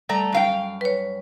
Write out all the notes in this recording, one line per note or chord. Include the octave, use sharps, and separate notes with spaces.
G3 A3 D5 A#5
F#2 F5 G5
B4 C#5